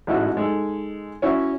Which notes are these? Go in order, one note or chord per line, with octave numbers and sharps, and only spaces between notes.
A1 G#2 E4 F#4 F#6
G#3 D#4 A4
C#4 E4 F#4